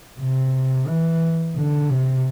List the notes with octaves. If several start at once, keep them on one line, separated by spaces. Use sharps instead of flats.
C3
E3
D3
C3